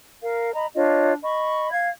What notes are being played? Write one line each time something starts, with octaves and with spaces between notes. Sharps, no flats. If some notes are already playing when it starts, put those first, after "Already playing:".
A#4 F5
D#5 A#5 B5
D4 F4 C#5 D#5
D#5 B5 C#6
F5 G#6